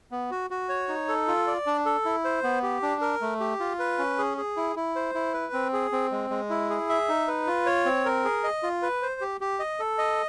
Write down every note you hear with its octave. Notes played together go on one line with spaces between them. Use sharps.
B3
F#4
F#4
C#5
D#4
A4
F4
D5
D4
A4
E4
C5
B3
G4
D4
A#4
A3
G4
F4
B4
C#4
G#4
G#4
E4
E4
C5
E4
B4
C4
G#4
C4
G#3
G#3
E4
G#4
E5
D#4
B4
F4
C#5
C4
A#4
G#4
D#5
F4
B4
C5
G4
G4
D#5
A4
D#5